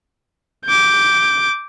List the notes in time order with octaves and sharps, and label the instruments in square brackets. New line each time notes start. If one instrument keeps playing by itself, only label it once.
[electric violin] D6 G6